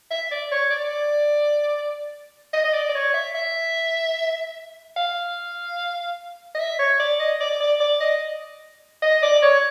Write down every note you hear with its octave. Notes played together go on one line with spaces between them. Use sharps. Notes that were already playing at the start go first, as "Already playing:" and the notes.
E5
D5
C#5
D5
D#5
D#5
D5
D5
C#5
E5
E5
F5
D#5
E5
C#5
D5
D#5
D5
D5
D5
D#5
D#5
D5
C#5